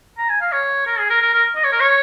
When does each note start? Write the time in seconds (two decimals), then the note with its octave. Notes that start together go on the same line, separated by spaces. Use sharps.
0.18 A#5
0.29 G#5
0.41 F5
0.52 C#5
0.87 A#4
0.99 G#4
1.10 A#4
1.22 A#4
1.33 A#4
1.56 D#5
1.64 C#5
1.72 A#4
1.81 C#5